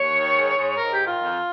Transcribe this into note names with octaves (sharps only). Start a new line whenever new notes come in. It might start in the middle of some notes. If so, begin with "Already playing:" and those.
Already playing: D#2 C#5
D#3
G#2
G#2
G#2 A#4
G4
D#3
F4
F2